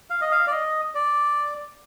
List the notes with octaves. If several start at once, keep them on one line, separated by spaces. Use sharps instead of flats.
F5
D#5
F5
D5
D#5
D5